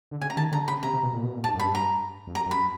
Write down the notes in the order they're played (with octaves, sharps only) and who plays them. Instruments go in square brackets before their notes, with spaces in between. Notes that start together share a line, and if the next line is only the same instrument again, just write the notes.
[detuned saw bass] D3
[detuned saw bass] C#3 [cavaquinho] G#5
[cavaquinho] A#5
[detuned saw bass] D#3 [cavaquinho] A5
[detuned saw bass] D3 [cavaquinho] A#5
[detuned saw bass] C#3 [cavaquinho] B5
[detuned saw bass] C3 [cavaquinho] A#5
[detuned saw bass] C3
B2
A#2
B2
A#2
[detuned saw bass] G#2 [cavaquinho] A5
[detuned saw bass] F#2
[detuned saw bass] G2 [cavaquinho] B5
[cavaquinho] A#5
[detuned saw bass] F2
[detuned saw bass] F#2 [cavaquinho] A#5
[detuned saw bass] F#2
[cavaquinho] B5